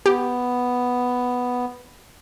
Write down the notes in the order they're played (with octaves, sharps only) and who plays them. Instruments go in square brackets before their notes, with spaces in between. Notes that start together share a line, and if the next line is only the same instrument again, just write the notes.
[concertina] B3 [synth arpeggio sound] G4